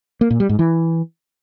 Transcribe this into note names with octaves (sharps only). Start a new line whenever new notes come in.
A#3
A#2
G3
G#2
E3